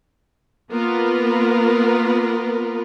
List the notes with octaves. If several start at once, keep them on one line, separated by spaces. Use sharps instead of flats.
A#3 B3 F4 A#4 B4